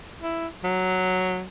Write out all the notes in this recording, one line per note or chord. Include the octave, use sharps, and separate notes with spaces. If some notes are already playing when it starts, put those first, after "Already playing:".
E4
F#3